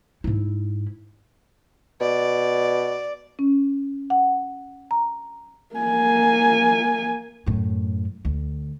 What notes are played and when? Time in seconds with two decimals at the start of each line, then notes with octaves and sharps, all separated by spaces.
0.24 G#2 E4
2.01 B2 D5
3.39 C#4
4.10 F#5
4.91 A#5
5.75 A#3 G#5
7.46 F#2 A2
8.25 D2